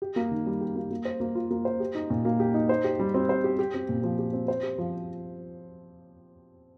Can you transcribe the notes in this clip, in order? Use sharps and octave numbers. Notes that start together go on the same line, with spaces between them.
G4
A#3
D#3
G3
G4
A#3
A#3
C5
A#3
F4
A#3
C5
G4
D#4
A#2
A#3
G4
D#4
C5
G4
G3
C4
C5
G4
G4
C4
A#2
F3
G4
C4
C5
G4
F3